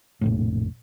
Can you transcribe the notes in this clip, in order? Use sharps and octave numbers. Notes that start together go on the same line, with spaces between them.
F1 A#1 A2